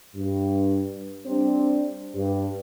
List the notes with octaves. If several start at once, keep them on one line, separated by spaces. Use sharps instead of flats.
G2
G3 C4 D4
G2